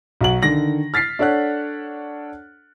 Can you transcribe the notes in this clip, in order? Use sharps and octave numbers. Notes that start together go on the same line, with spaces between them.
B1 F#4 F#7
D3 D#3 A#6 F#7
F6 A6 B6 C7
D4 A4 C#5 F#5 F#6